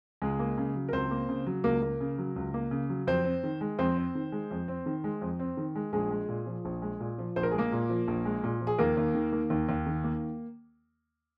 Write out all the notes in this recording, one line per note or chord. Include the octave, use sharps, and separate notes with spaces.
C#2 G#3 G#4
A#3
C#3
F#3
A#4
C#2 C4 C5
A#3
C#3
F#3
C#2 A#3 A#4
A#3
C#3
F#3
C#2
A#3
C#3
F#3
F2 C4 C5
C4
D#3
G#3
F2 C4 C5
C4
D#3
G#3
F2
C4
D#3
G#3
F2
C4
D#3
G#3
A#1 G#3 G#4
G#3
A#2
F3
A#1
G#3
A#2
F3
A#1 C5
A#4
G#4
G#3 A#3 A#4
A#2
F3
A#1
G#3
A#2
F3
G#4
D#2 A#3 A#4
D#2
D#3
A#3
D#2
D#2
D#3
A#3